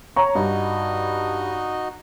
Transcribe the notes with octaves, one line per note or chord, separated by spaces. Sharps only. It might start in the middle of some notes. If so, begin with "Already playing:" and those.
C#5 A#5 C#6
G2 D#4 F#4 D#5